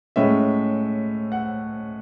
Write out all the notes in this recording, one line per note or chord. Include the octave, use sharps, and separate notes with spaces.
A2 G#3 C#4 E5
F#5